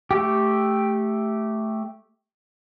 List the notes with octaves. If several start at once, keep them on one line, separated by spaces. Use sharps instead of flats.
A3 G4